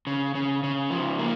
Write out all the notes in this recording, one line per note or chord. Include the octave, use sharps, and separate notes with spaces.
C#3
C#3
C#3
F3
A#3